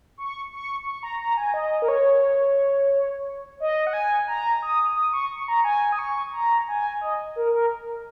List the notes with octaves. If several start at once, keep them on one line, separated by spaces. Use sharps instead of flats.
C#6
C#6
C#6
A#5
A#5
G#5
D#5
A#4
C#5
D#5
F#5
G#5
A#5
D#6
D#6
C#6
C#6
A#5
G#5
D#6
C#6
A#5
G#5
D#5
A#4
A#4